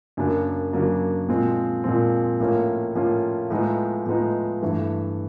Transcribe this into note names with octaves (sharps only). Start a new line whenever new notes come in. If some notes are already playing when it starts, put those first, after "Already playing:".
F#2 C#3 F#3 A#3 D4
F#2 C#3 F#3 A#3 D4
A#2 F3 G#3 C4
A#2 F3 G#3 C4
A2 F3 A#3 C#4 F4
A2 F3 A#3 C#4 F4
A2 F3 G#3 B3 D#4
A2 F3 G#3 B3 D#4
G2 E3 A3